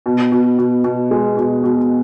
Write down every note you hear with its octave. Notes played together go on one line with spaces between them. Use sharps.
B2
B2
B2
B2
G#3
B2
B2